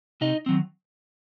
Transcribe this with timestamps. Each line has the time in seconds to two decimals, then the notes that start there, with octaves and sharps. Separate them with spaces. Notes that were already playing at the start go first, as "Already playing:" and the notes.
0.21 C3 D#4 D#5
0.46 D#3 F#3 C4